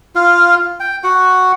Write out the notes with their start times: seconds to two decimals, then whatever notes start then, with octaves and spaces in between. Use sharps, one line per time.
0.16 F4 F5
0.80 G5
1.04 F#4 F#5